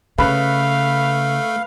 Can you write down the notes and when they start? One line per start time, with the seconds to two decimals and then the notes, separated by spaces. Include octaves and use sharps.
0.18 C#3 A3 B4 F5